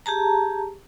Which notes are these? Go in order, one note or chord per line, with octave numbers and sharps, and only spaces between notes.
G4 G#4 A5 A#5